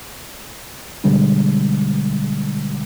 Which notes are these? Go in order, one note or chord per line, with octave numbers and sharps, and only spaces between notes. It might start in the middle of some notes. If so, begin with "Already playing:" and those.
B2 D3 G3 G#3